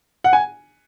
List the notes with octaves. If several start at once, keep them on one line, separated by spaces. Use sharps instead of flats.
F#5
G#5